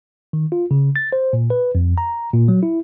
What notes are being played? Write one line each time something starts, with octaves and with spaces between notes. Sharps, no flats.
D#3
F4
C#3
A6
C5
A#2
B4
F2
A#5
A#2
F#3
E4